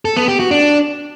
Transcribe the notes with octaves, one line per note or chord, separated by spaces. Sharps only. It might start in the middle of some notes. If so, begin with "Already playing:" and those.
A4
B3
G4
F#4
D4